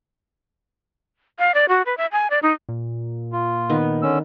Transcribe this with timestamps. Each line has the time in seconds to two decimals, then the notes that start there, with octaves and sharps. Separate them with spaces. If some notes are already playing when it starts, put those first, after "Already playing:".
1.39 F5
1.54 D5
1.69 F#4
1.86 B4
1.97 E5
2.12 G#5
2.30 D5
2.43 D#4
2.69 A#2
3.32 F4
3.70 D#3 B3
4.02 D3 C#4 E6